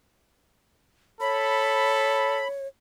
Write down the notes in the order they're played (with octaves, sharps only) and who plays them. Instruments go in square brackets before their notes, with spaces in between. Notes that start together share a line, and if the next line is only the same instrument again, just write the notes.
[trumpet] A4 [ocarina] C#5 [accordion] B5